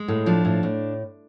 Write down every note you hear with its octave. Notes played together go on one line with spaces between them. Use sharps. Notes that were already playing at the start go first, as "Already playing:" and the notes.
Already playing: G#3
A2
F3 D4
A2
A2